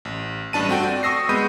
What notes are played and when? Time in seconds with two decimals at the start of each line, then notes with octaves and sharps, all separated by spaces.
0.05 A1
0.53 A1 G2 D4 A5 D#7
0.68 A3 C4 F#4 G5
0.83 D5
1.03 C#6 D#6 E6 A#6 C7
1.29 G#3 B3 B5 G6 D#7